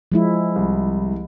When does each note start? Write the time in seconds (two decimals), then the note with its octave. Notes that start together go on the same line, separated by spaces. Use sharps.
0.12 F3 G#3 E4
0.56 C2